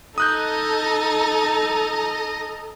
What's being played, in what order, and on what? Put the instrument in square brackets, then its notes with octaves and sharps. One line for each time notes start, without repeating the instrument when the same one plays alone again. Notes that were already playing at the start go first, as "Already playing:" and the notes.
[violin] D#4 [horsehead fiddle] A4 A#5 [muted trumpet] D#5 [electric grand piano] D#6 F#6 G6